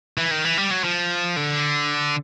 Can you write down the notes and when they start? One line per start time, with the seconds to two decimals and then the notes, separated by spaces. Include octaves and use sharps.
0.18 E3
0.31 D#3
0.45 E3
0.58 G3
0.71 F#3
0.84 F3
1.36 D3